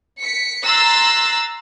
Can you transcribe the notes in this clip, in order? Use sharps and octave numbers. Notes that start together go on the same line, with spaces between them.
B6 C#7
A#5 C6 E6 F#6 A6